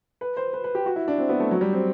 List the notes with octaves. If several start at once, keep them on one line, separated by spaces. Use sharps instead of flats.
B4
C5
B4
B4
G4
F#4
E4
D4
C4
B3
A3
F#3
G3
C4